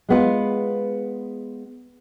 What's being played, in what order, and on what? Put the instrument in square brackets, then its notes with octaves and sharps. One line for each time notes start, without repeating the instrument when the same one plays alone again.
[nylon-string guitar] G#3 B3 F4